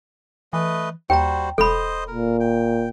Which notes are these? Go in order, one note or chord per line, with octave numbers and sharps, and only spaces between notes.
E3 A3 B4 D#5
D#2 G3 F#4 C5 G5 A#5
E1 A4 C5 D#5 B5
A#2 A#4
G5